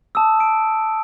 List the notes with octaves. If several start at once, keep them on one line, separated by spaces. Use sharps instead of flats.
A5 D#6 E6
D7